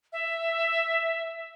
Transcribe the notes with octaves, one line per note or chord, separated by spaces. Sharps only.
E5